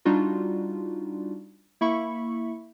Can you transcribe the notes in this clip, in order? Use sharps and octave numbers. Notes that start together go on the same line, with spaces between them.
G3 D4 D#4 F4 F#4
A#3 E4 E5 B5 C#6 C#7